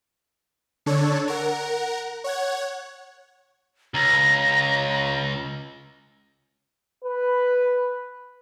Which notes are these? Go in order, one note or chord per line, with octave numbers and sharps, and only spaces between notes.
D3 D4 A4 C#5
A#4 F#5
C#5 F#5 G#6
C#2 A#5
B4